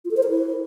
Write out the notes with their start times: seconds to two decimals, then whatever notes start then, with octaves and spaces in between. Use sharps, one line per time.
0.05 F4
0.11 A4
0.17 C5
0.23 A#4
0.29 E4